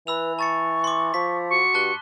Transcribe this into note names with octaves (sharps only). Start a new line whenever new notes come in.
E3 B4 B5 E6 F7
A5 C#6 A6 C#7
C6 D6
F3 B6
F#4 C#6
G2 A5 F#6 G7